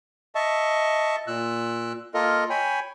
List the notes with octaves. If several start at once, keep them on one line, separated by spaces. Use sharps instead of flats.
D#5 E5 A5 C#6
A#2 E6 F#6
A#3 F4 A4 A#4 D#5
C#5 G5 G#5 B5